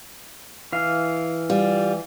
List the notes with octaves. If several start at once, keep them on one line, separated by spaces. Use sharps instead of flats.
E3 F5
G3 F4